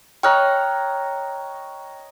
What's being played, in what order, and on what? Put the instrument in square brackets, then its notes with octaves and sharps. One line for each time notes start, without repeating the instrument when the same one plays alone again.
[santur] C#5 D#5 A#5 [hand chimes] G5 F6 F#6